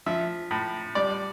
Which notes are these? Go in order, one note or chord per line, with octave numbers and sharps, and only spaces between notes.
F3 E5
A2
G3 D5